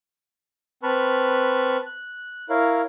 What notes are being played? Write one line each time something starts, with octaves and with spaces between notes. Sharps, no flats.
C4 B4 A5 B5 C#6 F6
F#6
E4 A#4 C#5 F5